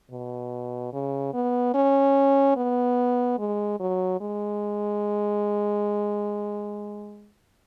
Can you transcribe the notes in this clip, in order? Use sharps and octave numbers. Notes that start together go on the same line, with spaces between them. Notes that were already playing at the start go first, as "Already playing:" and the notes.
B2
C#3
B3
C#4
B3
G#3
F#3
G#3